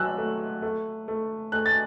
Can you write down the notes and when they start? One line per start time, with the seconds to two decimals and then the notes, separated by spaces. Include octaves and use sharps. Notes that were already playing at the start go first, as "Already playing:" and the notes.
Already playing: F#3 E6 F#6
0.18 A3
0.62 A3
1.08 A3
1.52 A3 F#6
1.66 A6